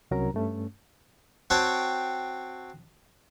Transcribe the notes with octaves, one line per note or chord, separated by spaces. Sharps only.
C2 C3 F#3 C#4 A#4 A#5
G2 A3 C#4
C4 F#4 C#5 G5 A5